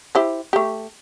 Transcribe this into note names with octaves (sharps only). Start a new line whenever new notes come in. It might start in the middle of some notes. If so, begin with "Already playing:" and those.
E4 G4 C5
A3 G4